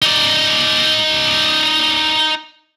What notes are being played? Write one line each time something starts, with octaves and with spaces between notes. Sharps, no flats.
D#4 D5